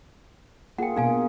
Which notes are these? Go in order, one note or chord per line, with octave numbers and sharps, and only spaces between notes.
A#3 F4 G#4 F#5 G5
B2 A#3 D4 G#4 F5 G#5